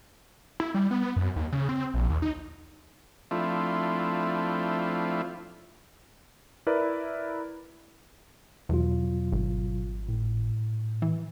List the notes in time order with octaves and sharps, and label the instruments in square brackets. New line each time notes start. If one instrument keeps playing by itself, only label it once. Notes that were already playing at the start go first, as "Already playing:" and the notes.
[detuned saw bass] E4
G3
B3
F#2
D#2
C#3
C4
A#1
D#2
D#4
[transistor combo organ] F3 A3 C4 D4 E4 F4
[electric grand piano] E4 A#4 B4 D5
[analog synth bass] E2 [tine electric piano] B2 F#3 F4
[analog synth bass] G#1
[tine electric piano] A2
[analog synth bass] E3